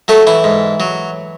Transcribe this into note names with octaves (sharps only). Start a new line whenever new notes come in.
F#3 A3 A4
E3 E4
G#2
F#3